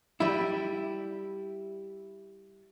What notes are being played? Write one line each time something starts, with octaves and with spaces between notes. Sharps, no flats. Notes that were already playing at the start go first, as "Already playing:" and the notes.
G3 E4